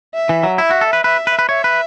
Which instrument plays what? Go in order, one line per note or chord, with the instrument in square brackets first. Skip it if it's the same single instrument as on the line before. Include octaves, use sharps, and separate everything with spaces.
[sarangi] E5
[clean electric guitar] E3
F#3
[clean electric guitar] E4 [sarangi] E5
[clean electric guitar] F#4
A4
B4
[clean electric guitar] B4 [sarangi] E5
[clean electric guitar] B4
B4
[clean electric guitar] C#5 [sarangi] E5
[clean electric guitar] B4